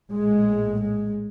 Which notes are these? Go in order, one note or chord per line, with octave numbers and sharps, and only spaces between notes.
A#1 A2 G#3
G#3